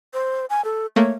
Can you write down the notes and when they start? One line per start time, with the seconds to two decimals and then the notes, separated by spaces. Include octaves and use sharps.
0.14 C5
0.50 G#5
0.65 A4
0.96 A3 A#3 C#5